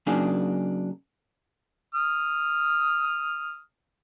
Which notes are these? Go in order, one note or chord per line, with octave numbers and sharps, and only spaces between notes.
C#3 F#3 A#3 D4 D#4 G#4
D#6 F6